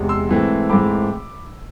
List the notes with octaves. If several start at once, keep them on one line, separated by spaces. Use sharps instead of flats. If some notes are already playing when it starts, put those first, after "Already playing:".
Already playing: E2 C3 G#3
C6 E6
G#2 E3 A3 C4
G#2 E3 A3 C4 B5 D6